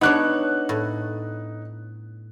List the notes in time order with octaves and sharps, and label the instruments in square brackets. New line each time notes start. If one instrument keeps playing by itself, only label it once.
[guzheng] B3 D4 C#5 [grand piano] D#4 F#6
[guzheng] A2